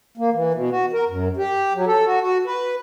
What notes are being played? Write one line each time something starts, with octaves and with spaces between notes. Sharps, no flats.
A#3
E3
B2
F#4
A#4
F#2
G4
F#3
A4
F#4
F#4
B4